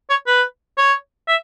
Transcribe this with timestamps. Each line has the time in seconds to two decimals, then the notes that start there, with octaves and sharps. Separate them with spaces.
0.10 C#5
0.27 B4
0.78 C#5
1.28 E5